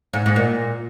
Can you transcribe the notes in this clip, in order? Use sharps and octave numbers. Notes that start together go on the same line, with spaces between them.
G#2
G#2
A#2